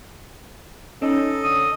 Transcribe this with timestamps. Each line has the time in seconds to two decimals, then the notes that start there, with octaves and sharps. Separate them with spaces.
1.02 C#4 D#4 A4 D#5
1.44 D3 D#6